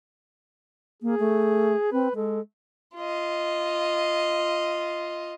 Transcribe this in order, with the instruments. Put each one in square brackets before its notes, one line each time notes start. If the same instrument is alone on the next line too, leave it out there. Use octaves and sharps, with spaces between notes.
[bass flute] A#3 [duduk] G#4
[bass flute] A3
[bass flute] C4 [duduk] B4
[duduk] G#3 [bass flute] A4
[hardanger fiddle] F4 D#5